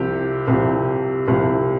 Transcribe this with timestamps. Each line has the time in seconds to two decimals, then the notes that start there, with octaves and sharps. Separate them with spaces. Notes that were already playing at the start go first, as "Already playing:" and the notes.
Already playing: C2 C3 F3 G4
0.48 C2 C3 F3
1.28 C2 C3 F3